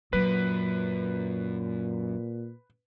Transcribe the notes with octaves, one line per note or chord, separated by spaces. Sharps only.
F#2 A#2 F#3 B4